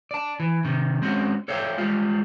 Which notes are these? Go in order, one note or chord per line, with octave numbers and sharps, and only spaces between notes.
D5 A5
E3
C3 D#3
G#3 C4 C#4 F#4
A4 C#5 D5 E5 F5 G5
G3 G#3 F4